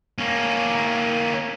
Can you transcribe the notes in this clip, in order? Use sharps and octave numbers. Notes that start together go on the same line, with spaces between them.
A#3 C#4